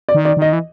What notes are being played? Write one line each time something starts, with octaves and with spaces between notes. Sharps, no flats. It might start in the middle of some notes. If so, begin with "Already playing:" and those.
D5
D#3
D5
D#3 D#5
E3